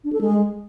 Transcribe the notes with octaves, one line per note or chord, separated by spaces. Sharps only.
D4
A4
G#3